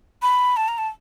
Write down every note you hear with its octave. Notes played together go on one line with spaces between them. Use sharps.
B5
A5
A#5
A5